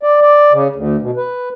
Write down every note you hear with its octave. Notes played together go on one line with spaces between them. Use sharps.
D5
D5
C#3
D2
B2
B4